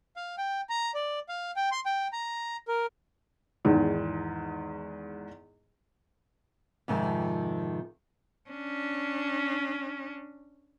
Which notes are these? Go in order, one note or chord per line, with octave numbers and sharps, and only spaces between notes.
F5
G5
A#5
D5
F5
G5
C6
G5
A#5
A#4
E2 G#2 D#3
F2 G#2 C3 D#3 F3
C#4 D4